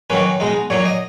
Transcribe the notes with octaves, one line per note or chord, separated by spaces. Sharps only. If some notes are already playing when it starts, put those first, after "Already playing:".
D#3 F#3 A#3 C#4 B4
B2 G#3 D#4
A#2 F#3 A#3 C#5
D#5